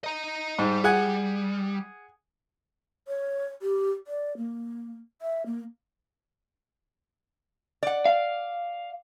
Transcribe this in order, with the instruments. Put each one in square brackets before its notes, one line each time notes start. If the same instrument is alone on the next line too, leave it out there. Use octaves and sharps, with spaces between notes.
[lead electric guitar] D#5 A#5
[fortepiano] G#2 [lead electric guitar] G3
[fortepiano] G#4 F#5 G#5
[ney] C#5
G4
D5
A#3
E5
A#3
[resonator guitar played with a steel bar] D5 F#5
[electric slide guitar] F5